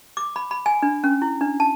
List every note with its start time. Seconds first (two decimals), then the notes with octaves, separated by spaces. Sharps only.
0.17 D6
0.36 B5
0.51 B5
0.66 G#5
0.82 D4
1.04 C#4
1.22 E4
1.41 D4
1.60 A5